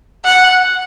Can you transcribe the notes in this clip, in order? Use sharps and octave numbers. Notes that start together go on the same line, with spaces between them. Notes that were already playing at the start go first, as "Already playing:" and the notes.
F#5